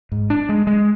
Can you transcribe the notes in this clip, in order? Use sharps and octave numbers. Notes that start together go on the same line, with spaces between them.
G#2
D4
G#3
G#3